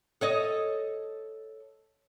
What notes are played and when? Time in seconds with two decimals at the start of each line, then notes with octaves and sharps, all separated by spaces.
0.21 A4 C#5 D#5